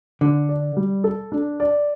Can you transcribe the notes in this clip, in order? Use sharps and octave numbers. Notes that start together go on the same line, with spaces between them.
D3 D4
D5
G3
A4
D4
D5